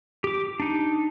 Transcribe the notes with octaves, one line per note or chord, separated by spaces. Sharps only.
G4 D6
D4 D#4